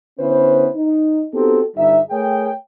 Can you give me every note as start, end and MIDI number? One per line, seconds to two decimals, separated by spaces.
0.20 0.69 50
0.20 0.69 59
0.20 0.69 61
0.20 0.69 64
0.20 0.69 71
0.20 0.69 72
0.76 1.24 63
1.34 1.60 59
1.34 1.60 60
1.34 1.60 63
1.34 1.60 66
1.34 1.60 67
1.34 1.60 69
1.77 1.98 31
1.77 1.98 55
1.77 1.98 63
1.77 1.98 76
2.11 2.51 57
2.11 2.51 68
2.11 2.51 70
2.11 2.51 73
2.11 2.51 79